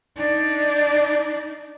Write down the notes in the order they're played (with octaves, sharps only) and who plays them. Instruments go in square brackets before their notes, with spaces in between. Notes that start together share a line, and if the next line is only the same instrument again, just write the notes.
[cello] D4 D#4